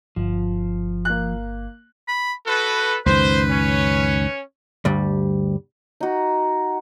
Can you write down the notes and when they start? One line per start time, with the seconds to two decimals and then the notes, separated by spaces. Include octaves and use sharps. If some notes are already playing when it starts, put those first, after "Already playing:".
0.16 G1 F3
1.05 A#3 F#6
2.08 B5
2.47 F#4 A4 B4
3.06 C#2 F#2 D#3 B4 C5
3.49 C#4 C#5
4.85 D2 G2 G3
6.00 D#4 F#4